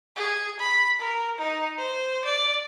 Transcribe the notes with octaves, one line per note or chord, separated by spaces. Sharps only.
G#4
B5
A#4
D#4
C5
D5